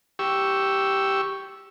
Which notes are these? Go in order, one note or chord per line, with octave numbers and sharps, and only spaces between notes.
G4 C#6 E6